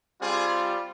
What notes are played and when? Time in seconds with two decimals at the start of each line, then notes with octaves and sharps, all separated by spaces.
0.20 G3 C4 F4 G#4